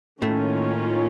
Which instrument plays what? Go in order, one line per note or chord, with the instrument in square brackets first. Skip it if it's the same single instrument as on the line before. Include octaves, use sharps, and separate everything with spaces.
[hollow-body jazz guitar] A2 A3 [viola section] D#3 A#3 C#4 F4